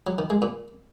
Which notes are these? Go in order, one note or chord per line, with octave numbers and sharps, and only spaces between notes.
F#3
D#3
G#3
A#2